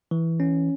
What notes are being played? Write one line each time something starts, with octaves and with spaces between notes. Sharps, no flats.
E3
C#4